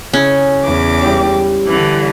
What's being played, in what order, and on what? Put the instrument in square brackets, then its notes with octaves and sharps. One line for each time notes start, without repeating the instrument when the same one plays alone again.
[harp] C#3 E4 [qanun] C#4
[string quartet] E2 D6
[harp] G3 E4 G4
[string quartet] D3 E3